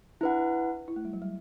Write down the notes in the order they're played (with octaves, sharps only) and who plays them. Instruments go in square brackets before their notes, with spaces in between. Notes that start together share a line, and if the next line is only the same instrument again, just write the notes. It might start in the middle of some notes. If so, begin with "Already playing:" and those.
[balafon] D4 [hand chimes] E4 B4 F#5
[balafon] E4
A3
G3
F#3
G3